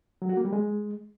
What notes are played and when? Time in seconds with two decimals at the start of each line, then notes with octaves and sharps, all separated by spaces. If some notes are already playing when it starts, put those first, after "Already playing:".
0.22 F#3
0.29 F#4
0.37 A#3
0.45 G3
0.53 G#3